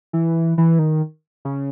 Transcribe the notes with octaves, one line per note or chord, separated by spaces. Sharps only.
E3
E3
D#3
C#3